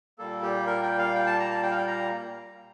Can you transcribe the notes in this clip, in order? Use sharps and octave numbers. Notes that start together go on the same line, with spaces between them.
A#2 G3 A#3 A4
G4
A#4
G5
F5
G5
A5
A#5
A5
G5
F5
G5
A#5